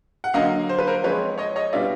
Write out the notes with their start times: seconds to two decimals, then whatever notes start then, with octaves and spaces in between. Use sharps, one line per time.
0.24 F#5
0.34 D3 F#3 A#3 D#5 F5
0.69 C5
0.79 B4
0.87 A#4 C5
1.04 F3 G#3 C4 B4 C#5
1.38 C#5 D#5
1.56 C#5 D#5
1.73 B2 G3 B3 D4 F4 D5 E5